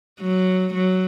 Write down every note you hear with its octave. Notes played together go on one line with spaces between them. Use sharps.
F#3
F#3